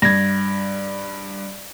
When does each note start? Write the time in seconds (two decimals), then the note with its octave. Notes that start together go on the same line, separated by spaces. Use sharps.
0.02 G2 G#6 A#6